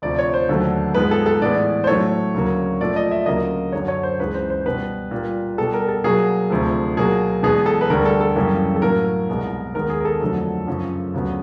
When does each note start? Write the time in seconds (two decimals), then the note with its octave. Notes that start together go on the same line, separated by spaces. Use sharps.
0.02 D2 C3 F3 D5
0.19 C#5
0.34 C5
0.49 D#2 D3 F#3 A3
0.95 G#2 F3 G#3 B3 B4
1.11 A4
1.26 A4
1.41 A2 E3 G#3 B3 D5
1.84 C5
1.87 A2 F#3 A3 C#5
2.34 D2 C#3 F#3 A#3
2.80 A#2 F3 A3 D5
2.96 D#5
3.11 E5
3.26 D2 C#3 F#3 A#3 D#5
3.72 F#2 D3 F#3 C#5
3.88 C#5
4.03 C5
4.19 C#2 C#3 E3 G#3 B4
4.34 C5
4.50 C5
4.65 B2 G3 B3 B4
5.11 A#2 G3 A#3
5.58 B2 G3 B3 A4
5.73 A#4
5.89 A4
6.04 B2 F#3 A#3 G#4
6.50 D2 C3 F3 A3
6.97 B2 F#3 A#3 G#4
7.43 E2 B2 G#3 B3 G#4
7.66 A4
7.81 B4
7.90 D2 D3 G3 A#4
8.05 A4
8.20 A4
8.35 F#2 C#3 E3 G3 A#3
8.76 A4
8.82 A2 F#3 A#3 A#4
9.29 C2 B2 G#3 B3
9.74 D#2 D#3 G#3 B3 A#4
9.90 G#4
10.00 A#4
10.05 A4
10.20 F2 D3 F#3 A3
10.67 F#2 C#3 F3
11.14 D2 C#3 F#3 B3